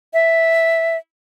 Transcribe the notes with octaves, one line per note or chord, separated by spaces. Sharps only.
E5